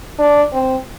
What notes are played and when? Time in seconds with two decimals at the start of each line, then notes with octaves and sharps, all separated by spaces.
0.19 D4
0.53 C4